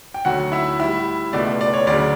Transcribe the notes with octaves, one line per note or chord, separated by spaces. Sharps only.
G5
D2 D3 F#3 A3 F#4 F#5
E4 E5
A2 G3 E4 E5
C#2 B2 A3 D5
D5
C#5
D2 C#3 F#3 D5